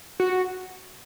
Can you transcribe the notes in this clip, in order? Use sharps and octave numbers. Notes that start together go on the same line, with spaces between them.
F#4